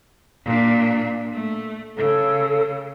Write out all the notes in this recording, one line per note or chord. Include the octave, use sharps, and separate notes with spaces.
A#2 D4
A3
C#3 A4